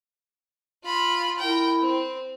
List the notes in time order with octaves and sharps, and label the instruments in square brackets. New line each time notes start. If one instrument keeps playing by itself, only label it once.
[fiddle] F4 B5
[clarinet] E4 [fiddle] A#4 G5
[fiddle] C4